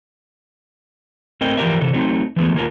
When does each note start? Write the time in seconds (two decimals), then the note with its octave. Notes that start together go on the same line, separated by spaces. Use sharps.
1.41 A3 C4 A#4 D#5 G5
1.57 E3 F3 G4 A#4 D5 E5
1.81 C3 E3 A4
1.93 F#3 A3 C4 D#4
2.36 E3 F3 G#3 A3 B3
2.54 D#3 A#3 F4 A#4